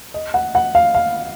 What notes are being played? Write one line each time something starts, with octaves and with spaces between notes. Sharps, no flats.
D#5
F#5
F#5
F5
F5